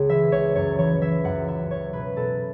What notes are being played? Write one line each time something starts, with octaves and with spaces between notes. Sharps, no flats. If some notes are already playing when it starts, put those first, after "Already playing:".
Already playing: C#2 C#3 C#5
E3 E5
C#2 C#5
F#2 C#5
E3 C#5
E3 E5
F#2 F#5
E3 E5
F#2 C#5
B2 B4
B2 A4